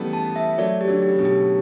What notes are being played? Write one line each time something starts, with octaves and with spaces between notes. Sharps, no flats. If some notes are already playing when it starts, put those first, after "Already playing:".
Already playing: C#3 E3 G3 A3 B3
A5
E5
F#3 A3 D5
G4
D3 F#3
G4
C#3
B2 D3
G4